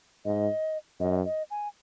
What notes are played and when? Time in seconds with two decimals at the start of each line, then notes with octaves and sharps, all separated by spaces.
0.25 G#2 D#5
1.00 F#2 D#5
1.25 D#5
1.51 G#5